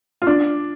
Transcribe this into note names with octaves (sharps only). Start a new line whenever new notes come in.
F4
D4